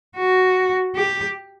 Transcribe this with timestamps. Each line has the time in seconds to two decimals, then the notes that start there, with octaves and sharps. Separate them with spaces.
0.17 F#4
0.95 G4